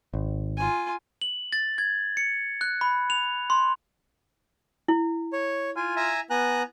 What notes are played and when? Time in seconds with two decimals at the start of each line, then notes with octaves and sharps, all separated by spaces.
0.14 G#1
0.57 F4 G#5
1.22 F#7
1.53 A6
1.78 G#6
2.17 C#7
2.61 F#6
2.81 B5
3.10 F7
3.50 C6
4.88 E4
5.33 C#5
5.76 F4 G#5
5.96 E5 G#5 A#5
6.30 B3 G#5 A#5 F#6